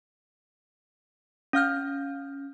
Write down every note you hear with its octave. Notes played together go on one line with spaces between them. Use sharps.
C#4 F5 F6 G6